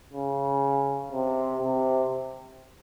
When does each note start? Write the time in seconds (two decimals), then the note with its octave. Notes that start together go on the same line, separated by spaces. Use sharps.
0.14 C#3
1.12 C3
1.62 C3